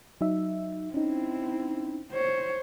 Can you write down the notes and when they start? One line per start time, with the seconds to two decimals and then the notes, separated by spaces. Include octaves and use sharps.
0.21 F#3 D#4 E5
0.94 C4 C#4 D#4 E4
2.12 C5 C#5